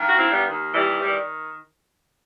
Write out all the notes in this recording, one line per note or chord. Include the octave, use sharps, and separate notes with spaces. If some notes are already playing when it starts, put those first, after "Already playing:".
Already playing: G2 D#3
F#4
C4 E4
G3 B3
D#2 D#3
E3 G3
D#3 E3 G3